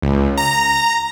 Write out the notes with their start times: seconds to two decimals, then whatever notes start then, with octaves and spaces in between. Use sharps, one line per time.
0.02 C#2
0.38 A#5